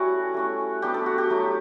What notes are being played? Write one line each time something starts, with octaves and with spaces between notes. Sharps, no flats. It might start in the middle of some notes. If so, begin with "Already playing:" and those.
Already playing: G3 A3 C#4 E4 F#4
A3 C#4 E4
G3 B3 D4 G4
A4
F#4
G4
F#3 A3 E4